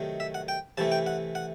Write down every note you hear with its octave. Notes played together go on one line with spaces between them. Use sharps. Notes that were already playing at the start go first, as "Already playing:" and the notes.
Already playing: C3 D#3 F#3 A3
E5
F#5
G5
C3 E3 A3 A5
G5
F#5
F#5